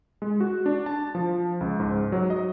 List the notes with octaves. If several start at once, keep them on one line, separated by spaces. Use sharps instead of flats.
G#3
F#4
D4
A5
F3
C#2
G#2
F#3
D#5